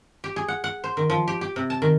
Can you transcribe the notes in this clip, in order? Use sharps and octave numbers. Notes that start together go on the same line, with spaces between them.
G4
G#4
F#5
F#5
C5
D#3
F3
G4
G4
C3
A5
D#3